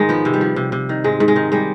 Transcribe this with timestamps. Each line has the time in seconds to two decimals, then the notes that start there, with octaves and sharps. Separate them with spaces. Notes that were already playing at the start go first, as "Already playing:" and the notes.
Already playing: G#2 D#3 G#3
0.09 F3 B3
0.25 C3
0.34 G3
0.41 F3
0.56 C3
0.72 C3
0.89 D#3
1.04 G#2 G#3
1.20 G#2
1.28 G#3
1.36 D#3
1.52 G3 G#3